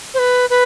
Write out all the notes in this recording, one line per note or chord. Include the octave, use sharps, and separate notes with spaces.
C5
B4
B4